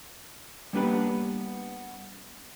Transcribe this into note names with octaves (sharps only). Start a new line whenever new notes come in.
G3 A#3 B3 D4 G4 B4